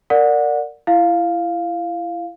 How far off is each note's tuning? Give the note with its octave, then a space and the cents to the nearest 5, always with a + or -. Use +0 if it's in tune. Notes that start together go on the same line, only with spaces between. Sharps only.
A#4 -15 D5 +0 F#5 -25
E4 +30 F5 +0